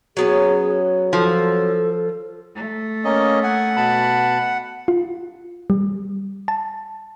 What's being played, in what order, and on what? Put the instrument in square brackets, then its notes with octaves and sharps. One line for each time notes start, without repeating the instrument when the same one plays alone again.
[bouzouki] F#3 B3 C#4 [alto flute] G#4
[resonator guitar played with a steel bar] F3 [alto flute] A4
[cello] A3
[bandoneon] A#3 C#4 D#5
[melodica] F#5 [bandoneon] G#5
[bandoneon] B2 A5 B5
[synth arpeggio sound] F4
G3
A5